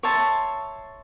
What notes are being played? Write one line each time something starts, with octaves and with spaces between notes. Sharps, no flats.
C#5 E5 A5 C6